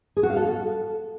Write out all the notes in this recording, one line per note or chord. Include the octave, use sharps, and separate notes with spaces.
G#4
F#4
F5
A4